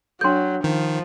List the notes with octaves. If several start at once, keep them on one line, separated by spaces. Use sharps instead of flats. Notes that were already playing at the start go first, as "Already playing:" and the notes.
F#3 D4 A4 C6 G6
D#3 F3